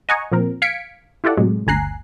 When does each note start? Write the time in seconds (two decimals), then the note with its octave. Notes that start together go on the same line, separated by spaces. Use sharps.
0.09 D#5 F#5 G#5 A#5 C#6
0.32 A#2 F3 C4 A#4
0.62 F5 G#6 B6 C#7 D7
1.24 E4 F4 G4 A4 D5 F#5
1.37 A2 C3 F#3 G#3
1.67 G1 D2 G#5 A#5 F#6 C7